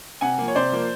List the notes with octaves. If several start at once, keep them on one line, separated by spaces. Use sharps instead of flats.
C3 F#5 G#5
F3 A#3
C#5
C3 C5 D5
F3 A#3